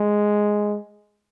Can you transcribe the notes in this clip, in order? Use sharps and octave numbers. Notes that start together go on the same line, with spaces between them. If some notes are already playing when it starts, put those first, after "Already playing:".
Already playing: G#3